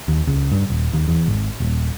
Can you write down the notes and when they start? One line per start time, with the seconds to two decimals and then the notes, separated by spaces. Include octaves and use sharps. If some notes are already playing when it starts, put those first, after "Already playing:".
0.08 D#2
0.27 C#2
0.52 G2
0.70 D#1
0.93 D#2
1.08 E2
1.28 G#1
1.60 D#1